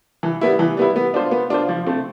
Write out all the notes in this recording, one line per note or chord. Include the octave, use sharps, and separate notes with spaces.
E3
G3 B3 E4
E3
G3 B3 E4
B3
D4 F4 C5
B3
D4 F4 C5
F3
A3 C4